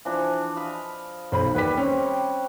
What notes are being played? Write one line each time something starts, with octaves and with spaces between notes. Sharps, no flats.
E3 F3 D4
D#5 F5 B5
B1 C5 B5
D#2 G3 B4 F#5 B6
C4 C#4